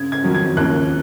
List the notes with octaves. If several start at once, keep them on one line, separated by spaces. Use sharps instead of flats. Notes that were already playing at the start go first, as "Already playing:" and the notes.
Already playing: C#3 G#6
G#6
F2 D#3 F#3
G#6
D#2 C#3 F3 A#3 F#6